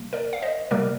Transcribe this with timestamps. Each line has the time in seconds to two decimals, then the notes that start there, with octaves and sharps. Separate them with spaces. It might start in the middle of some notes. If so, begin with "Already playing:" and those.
Already playing: C3 G3 A#3
0.13 A#4 D5
0.33 F5
0.42 C5 D#5
0.71 C3 G3 A#3 A#4 D5